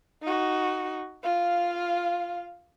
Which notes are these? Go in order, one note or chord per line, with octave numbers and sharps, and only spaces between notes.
D#4 F#4
F4 F5